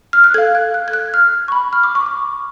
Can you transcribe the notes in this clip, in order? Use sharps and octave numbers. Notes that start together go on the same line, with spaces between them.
F6
F#6
A4 F5 G#6
F#6
F#6
G#6
F#6
F6
F6
C#6
B5
F6
D6
C#6
D6